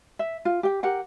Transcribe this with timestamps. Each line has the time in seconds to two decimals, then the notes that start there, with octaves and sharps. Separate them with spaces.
0.19 E5
0.45 F4
0.63 G4 G5
0.83 G4 A#4 F#5 G5